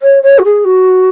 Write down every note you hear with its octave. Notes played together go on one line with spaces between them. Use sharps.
C#5
C#5
F#4
G#4
F#4